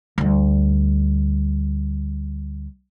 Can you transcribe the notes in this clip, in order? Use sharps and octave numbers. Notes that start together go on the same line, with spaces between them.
D2 G3